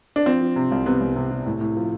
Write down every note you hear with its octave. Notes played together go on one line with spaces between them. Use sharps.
D4
F3 C4
F3
C3
C2
C3 B3
C2
C3
C3
A2
A2
F3